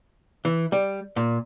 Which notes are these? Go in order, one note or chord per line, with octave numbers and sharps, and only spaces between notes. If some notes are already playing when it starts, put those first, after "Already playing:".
E3
G3
A#2